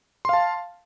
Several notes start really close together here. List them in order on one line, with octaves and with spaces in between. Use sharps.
C6 F5 A5